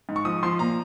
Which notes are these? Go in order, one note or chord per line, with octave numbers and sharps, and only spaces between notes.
G#2
C#6
F3 D#6
F3 C6
A#2 A#5